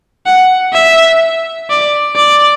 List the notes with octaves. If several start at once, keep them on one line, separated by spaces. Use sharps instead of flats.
F#5
E5
D5
D5